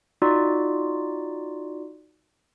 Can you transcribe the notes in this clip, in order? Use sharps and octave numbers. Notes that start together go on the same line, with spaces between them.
D#4 F4 F#4 D5